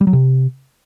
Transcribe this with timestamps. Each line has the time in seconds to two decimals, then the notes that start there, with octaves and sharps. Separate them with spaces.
0.01 G3
0.07 F#3
0.13 C3